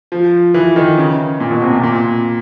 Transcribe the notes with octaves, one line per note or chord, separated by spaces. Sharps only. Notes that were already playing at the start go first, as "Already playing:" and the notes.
F3
E3
D#3
C#3
A#2
B2
C3
A#2
A#2